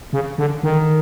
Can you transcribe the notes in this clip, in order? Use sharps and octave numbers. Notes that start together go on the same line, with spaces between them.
C#3
D3
D#3